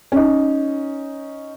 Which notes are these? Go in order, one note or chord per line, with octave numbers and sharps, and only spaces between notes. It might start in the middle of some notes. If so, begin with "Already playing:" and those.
C#4 D#4